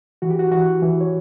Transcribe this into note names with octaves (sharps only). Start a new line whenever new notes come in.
E3 F#4
G4
F#4
E3 F#4
E3
C#5